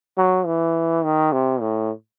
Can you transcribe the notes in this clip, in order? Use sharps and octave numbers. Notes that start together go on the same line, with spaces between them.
F#3
E3
D#3
C3
A2